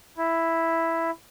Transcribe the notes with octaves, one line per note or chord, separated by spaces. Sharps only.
E4